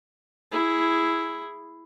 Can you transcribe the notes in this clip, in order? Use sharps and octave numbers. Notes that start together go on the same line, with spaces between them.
E4 G#4